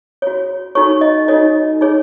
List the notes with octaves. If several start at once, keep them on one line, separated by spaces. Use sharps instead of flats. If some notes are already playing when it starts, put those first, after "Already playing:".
F#4 C#5
D#4 F#4 A4 C#5 C#6
D#5
D#4 F#4 A4 C#5 D#5
D#4 G#4 C#5